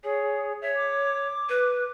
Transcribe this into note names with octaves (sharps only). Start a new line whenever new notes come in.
G#4 C#5 G#5
C#5 E5
D6
B4